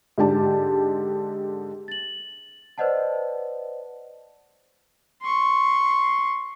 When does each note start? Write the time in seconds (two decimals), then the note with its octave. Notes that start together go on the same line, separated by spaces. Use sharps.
0.18 G#2 D3 G4 A5
1.88 A6 F#7
2.78 B4 C5 D5 D#5 F#5 A5
5.22 C6 C#6